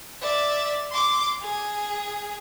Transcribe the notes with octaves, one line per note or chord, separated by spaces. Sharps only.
D5 E5
C6 D6
G#4